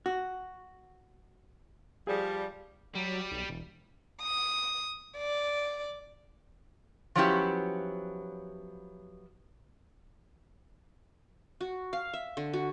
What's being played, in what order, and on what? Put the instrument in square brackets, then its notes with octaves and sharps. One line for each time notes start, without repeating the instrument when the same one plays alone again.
[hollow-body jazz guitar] F#4
[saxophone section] F3 G3 [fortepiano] G#4
[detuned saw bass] F#3 [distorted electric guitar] G3
[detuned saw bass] B1
E1
[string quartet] D#6
D5
[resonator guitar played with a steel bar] F3 F#3 B3 C#4 E4 G4
[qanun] F#4
F5
E5
D3
F#4